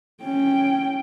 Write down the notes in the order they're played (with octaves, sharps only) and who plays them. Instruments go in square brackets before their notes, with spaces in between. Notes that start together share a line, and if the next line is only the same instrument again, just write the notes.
[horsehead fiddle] C#4 G5